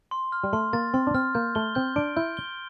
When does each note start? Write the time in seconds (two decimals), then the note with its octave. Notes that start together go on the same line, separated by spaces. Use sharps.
0.11 C6
0.32 F6
0.44 G3
0.53 A3 C6
0.73 A#3 A6
0.94 C4 C6
1.07 D4
1.15 C4 F6
1.35 A#3 G6
1.55 A3 G7
1.75 C4 G6
1.96 D4 D7
2.17 E4 G6
2.37 G7